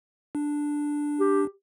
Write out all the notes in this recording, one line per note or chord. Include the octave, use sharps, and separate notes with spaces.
D4
G4